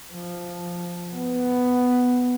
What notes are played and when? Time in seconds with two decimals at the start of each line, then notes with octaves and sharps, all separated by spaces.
0.12 F3
1.15 B3